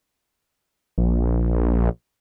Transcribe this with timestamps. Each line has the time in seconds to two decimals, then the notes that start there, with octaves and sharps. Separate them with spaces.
0.98 A#1